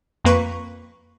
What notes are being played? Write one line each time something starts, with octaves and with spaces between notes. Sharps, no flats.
F2 A#3 B4 C#6